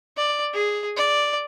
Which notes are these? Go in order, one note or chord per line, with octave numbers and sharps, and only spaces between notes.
D5
G#4
D5